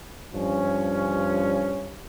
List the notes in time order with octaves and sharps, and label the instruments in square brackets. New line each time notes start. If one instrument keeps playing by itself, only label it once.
[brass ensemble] G2 F3 C#4